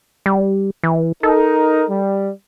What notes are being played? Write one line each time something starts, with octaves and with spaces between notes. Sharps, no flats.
G3
E3
D#4 A4 A#4
G3